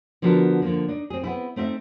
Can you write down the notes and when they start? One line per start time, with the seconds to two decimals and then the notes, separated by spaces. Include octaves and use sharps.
0.22 D3 F3 B3 F#4 A4 A#4
0.62 D3 F3 A#3
0.88 D4 D#4
1.10 C4 G#4
1.24 B3 C4 E4
1.56 A3 C4 D#4 E5